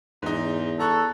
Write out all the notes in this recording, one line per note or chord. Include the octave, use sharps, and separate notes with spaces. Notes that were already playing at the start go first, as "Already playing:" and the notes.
E2 G#2 D#4
A4 A#5 C#6 F#6